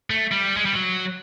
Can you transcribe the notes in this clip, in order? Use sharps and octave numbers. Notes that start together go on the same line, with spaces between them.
A3
G3
G#3
G3
F#3